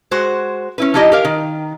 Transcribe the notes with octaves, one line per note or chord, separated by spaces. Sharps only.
G#3 F#4 C5
C#4 E4 B4
F3 D#4 E4 G4 D#5
G4 A#4 F5
D#3